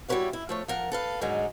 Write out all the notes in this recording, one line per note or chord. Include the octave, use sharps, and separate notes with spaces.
G3 E4 F#4 B4 C#5 F5
E4
F3 A3 C#5
F3 A#4 F#5
A4 B4 F5
G#2 D3 D#3 F#3 G#3 D#4